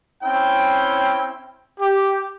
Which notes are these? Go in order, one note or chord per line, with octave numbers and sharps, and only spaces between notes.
C4 C#4 E4 G5
G4